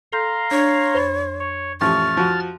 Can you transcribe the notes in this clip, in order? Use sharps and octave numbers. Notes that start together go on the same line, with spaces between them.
A4 F5 A#5 C6 G6
D4 C#5 D5
F2 C5 B5 A6
C#5 C#6
A1 F3 G4 C#6 F6 A6
F3 F#4